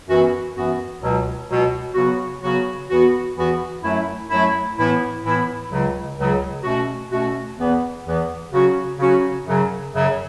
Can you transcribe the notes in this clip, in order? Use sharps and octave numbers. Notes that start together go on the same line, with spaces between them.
F#2 E3 B3 F#4
F#2 E3 B3 F#4
C#2 B2 F#3
C#2 B2 F#3
C#3 F#3 B3 F#4
C#3 F#3 B3 F#4
E2 E3 B3 F#4
E2 E3 B3 F#4
F#2 F#3 A3 E4
F#2 F#3 A3 E4
A2 E3 B3 E4
A2 E3 B3 E4
C#2 C#3 F#3
C#2 C#3 F#3
B2 A3 C#4 F#4
B2 A3 C#4 F#4
E2 E3 B3
E2 E3 B3
C#3 F#3 C#4 F#4
C#3 F#3 C#4 F#4
F#2 C#3 F#3
F#2 C#3 F#3